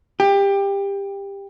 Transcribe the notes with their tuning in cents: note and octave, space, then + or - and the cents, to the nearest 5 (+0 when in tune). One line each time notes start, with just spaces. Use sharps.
G4 +20